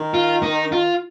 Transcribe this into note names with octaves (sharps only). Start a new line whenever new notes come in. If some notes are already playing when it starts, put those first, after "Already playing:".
Already playing: D#3
F4
D#4
F4